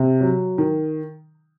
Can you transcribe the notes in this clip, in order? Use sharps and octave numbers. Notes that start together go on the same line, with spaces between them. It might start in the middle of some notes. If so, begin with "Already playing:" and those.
Already playing: C3
F#3
D#3